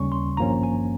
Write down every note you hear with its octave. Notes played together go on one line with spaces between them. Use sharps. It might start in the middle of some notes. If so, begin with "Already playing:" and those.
Already playing: D#2 C#3 G3 C#4 C#6
C6
G#1 G2 F3 A#3 C#4 A#5
G#5